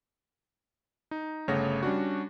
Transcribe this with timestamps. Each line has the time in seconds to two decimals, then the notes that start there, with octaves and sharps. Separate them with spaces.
1.11 D#4
1.48 G1 C#3 A3 C#5 F#5 A#6
1.83 G3 C#4 D4 F#4